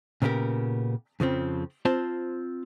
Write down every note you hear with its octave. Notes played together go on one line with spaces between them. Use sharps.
A#2 C#3 B3 C#4 G4 A#4
F2 C#3 F3 C4
C4 F4 C5 A5